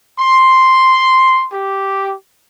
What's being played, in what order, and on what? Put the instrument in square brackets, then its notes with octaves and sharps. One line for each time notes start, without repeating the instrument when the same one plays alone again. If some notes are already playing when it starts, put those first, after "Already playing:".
[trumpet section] C6
G4